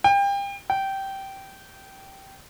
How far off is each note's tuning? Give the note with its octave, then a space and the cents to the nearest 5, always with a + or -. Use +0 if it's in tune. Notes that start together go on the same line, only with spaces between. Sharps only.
G5 +30
G5 -15